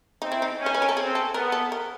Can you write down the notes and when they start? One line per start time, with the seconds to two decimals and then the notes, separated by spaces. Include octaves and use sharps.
0.21 C4 D#4
0.32 E4
0.42 D#4
0.59 C#4
0.66 C5
0.74 B4
0.82 A#4
0.88 A4
0.97 C4 G#4
1.15 A4
1.34 B3 A#4
1.52 A4
1.72 A#4